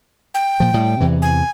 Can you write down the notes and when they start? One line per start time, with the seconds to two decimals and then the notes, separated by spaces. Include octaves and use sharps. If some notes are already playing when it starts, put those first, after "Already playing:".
0.34 G5
0.60 A#2 F3
0.74 A2 G3
1.00 E2 C3 E3
1.22 G#5